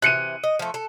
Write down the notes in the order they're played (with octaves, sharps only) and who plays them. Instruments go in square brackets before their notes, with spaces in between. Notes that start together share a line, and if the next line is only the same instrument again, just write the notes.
[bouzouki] C3 E3 [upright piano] F#6 C#7 D#7
[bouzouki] D#5
F3 A3
A4